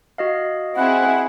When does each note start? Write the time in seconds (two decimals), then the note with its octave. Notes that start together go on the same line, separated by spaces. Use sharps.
0.18 F#4 D#5 F5
0.76 C4 E4 G#4 F#5